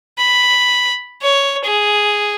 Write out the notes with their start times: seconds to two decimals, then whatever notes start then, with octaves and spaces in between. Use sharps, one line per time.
0.18 B5
1.22 C#5
1.64 G#4